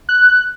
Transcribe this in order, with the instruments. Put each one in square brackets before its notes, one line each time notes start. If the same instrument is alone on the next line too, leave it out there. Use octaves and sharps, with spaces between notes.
[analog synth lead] F#6